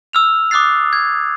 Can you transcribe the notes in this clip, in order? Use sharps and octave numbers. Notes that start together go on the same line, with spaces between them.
E6 F6 F7
D6 D#6 F#6 A6 C7
G#6